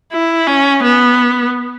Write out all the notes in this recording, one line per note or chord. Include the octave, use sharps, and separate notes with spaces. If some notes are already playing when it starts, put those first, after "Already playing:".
E4
C#4
B3